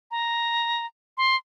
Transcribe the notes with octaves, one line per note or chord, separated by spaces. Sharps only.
A#5
C6